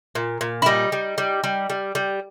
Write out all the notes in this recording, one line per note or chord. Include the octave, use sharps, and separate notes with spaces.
A#2
A#2
E4
G3 D#4
G3
G3
G3
G3
G3